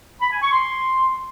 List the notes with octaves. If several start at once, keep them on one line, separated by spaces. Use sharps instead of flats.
B5
G#5
C#6
C6